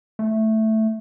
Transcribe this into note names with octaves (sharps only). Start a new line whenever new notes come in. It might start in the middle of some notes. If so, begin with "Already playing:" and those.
A3